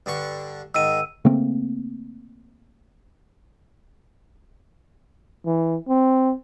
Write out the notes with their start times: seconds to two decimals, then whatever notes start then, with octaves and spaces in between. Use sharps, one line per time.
0.06 G2 D3 C#6
0.75 G#2 D#3 E6 D#7
1.25 C#3 A3 A#3 C4
5.46 E3
5.88 C4